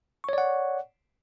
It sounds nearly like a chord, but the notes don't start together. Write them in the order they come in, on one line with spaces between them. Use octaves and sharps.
C#6 C#5 D5 F#5